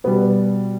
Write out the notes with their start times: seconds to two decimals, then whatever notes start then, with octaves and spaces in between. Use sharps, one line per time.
0.04 B2 G3 B3 B4